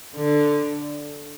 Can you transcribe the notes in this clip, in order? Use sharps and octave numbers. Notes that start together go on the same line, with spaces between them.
D3